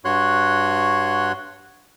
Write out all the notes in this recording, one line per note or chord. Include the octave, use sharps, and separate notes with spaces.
G2 F#4 C#5 C6 F#6